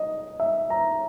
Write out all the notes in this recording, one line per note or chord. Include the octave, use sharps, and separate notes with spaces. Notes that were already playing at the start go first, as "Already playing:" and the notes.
Already playing: D#5
E5
A#5